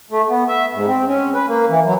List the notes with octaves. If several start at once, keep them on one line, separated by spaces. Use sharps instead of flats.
A3
B3
E5
G#2
C4
C#4
B4
A#3
E3
F#3